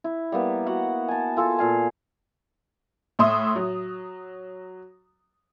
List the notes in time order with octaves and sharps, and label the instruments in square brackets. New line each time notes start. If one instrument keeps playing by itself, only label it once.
[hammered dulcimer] E4
G3 A#3 B3
F#4 F#5
G#5 A5
F4 A4 G#5 A5
A#2 F5 G#5
[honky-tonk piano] A2 E5 C6 D#6
F#3